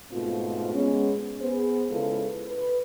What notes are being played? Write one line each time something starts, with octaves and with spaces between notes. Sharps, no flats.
G#2 B2 A3 C4 F4
G#3 B3 C#4
B3 G#4 C5
C#3 G#3 E4 F4 A4 B4
B4